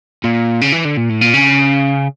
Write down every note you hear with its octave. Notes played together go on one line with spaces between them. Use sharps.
A#2
C#3
E3
D3
A#2
A2
A#2
C#3